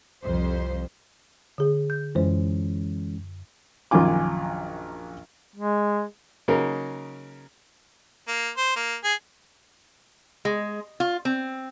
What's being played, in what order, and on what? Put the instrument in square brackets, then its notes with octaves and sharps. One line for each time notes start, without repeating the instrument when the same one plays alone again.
[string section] C2 F2 C5
[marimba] D3 G#4
G6
[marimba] F#2 C5 [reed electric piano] E3 G#3 C#4
[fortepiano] A#1 F#2 D#3 F4 G#5 D6
[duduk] G#3
[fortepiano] C#3 F#3 A#3 C#4 D#4 A#4
[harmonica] A#3
C5
A#3
G#4
[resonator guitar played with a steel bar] G#3
F4
C4